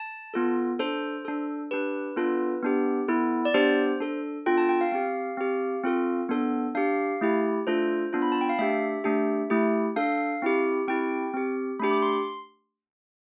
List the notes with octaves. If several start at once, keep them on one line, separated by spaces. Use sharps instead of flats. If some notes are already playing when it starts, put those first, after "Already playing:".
Already playing: A5
B3 F4 A4
D4 A4 C5
D4 A4
D4 G4 B4
B3 D4 F4 A4
B3 D4 G4
B3 E4 A4
D5
B3 D4 G4 C5
D4 A4
B3 D4 F4 A4 G5
A5
G5
F5
C4 G4 F5
C4 G4
C4 F4 A4
B3 D4 A4
D4 G4 F5
A3 E4 G4
A3 D4 F4 A4 C5
B3 D4 F4
B5
A5
G5
F5
A3 D4 G4 E5
A3 D4 G4
A3 E4 G4
D4 A4 F5
C4 E4 G4
C4 E4 G4 G5
C4 G4
A3 D4 G4 B5
D6
C6